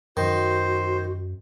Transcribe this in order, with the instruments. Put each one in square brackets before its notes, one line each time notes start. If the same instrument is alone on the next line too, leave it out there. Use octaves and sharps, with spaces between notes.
[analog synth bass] F#2 [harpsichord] D#3 [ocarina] F#4 [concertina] C5